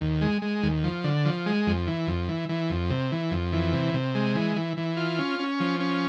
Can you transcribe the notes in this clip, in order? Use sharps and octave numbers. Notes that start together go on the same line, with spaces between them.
D#2
G#3
G#3
D#2
F3
D3
F3
G#3
F2
E3
F2
E3
E3
F2
C3
E3
F2
E3
C3
C3
G#3
E3
E3
E3
F4
C#4
C#4
F3
C#4